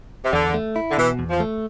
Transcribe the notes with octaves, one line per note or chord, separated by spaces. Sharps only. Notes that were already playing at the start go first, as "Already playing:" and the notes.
C3
E2 D3
A3
E4
D3
B2 E3
E2
F3
A3